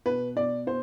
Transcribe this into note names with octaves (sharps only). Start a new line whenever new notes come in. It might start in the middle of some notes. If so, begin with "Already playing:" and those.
B2 B4
B2 D5
B2 C5